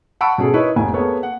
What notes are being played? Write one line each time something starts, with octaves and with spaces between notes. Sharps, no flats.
F#5 A5 B5 C#6 E6 D7
B2 C#4 G#4 A4
D#4 E4 A#4 B4 C#5
F1 G#5
A#3 B3 G#4 A4 C#5
F#5